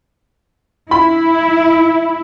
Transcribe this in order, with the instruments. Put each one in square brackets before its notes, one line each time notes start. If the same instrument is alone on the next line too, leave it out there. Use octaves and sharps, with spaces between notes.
[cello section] E4 [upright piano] B5